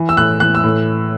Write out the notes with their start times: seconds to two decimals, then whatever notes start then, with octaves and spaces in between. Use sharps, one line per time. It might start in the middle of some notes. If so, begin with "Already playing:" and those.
Already playing: E3
0.09 E6
0.17 A2 F#6
0.40 E3 F#6
0.55 E6
0.64 A2